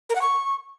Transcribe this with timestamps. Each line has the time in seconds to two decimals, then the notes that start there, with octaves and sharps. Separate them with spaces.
0.09 A#4
0.15 F#5
0.21 C#6